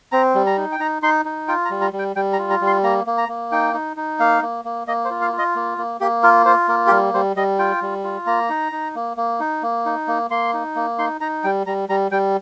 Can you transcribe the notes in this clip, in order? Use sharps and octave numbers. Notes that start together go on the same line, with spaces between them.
C4 A#5
G3
A#5
D#4
G5
D#4 A#5
D#4 C6
D#4
F4 G5
A#5
G3
A#5
G3
G5
G3 G5
A#5
F4
A#5
G3
C6
A#3 A#5
A#3
A#5
A#3
D#4 G5
D#4
D#4
A#3 F5
A#3
A#3
A#3 D#5
C5
F4
F5
F4
D#5
A#3
A#3
A#3 G4
F4 A#4
F4 C5
A#3 A#4
G4
G3 A#4
G3 C5
G3 D#5
F4 G5
G3
F4
A#3 A#5
D#4
D#4
A#3
A#3
D#4
A#3
D#4
A#3
A#3 C6
D#4
A#3
D#4 C6
D#4 A#5
G3 G5
G3 A#5
G3 A#5
G3 G5